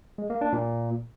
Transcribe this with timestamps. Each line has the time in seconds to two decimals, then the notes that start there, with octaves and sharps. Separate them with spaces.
0.18 G#3
0.30 A#3
0.41 D4
0.53 A#2